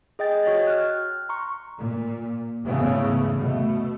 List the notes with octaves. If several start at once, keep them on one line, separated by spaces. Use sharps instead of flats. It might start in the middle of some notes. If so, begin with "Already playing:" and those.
G#4 D#5 G5 A6
F#4 C#5 D#5 G5
F6 F#6
A#5 C6 C#6
A#2
E2 G#2 C#3 A3 B3 C#4
B2 A3